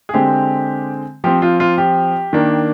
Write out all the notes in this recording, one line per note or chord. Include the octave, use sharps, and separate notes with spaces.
G#4
D3 G#3 C4 G4
F3 C4 G4
F4
F4
G4
D#3 A#3 D4